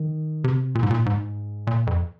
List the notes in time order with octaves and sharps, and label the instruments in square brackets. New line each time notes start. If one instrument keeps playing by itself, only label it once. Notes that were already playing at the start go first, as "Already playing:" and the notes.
Already playing: [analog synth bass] D#3
C3
A#2
G#2
A#2
G#2
A#2
F2